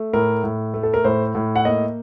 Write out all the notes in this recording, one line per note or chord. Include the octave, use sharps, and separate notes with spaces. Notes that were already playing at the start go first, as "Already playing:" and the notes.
Already playing: A3
A2 A#4
A2
A3
A4
A#4
A2 C5
A2
F#5
A#3 D#5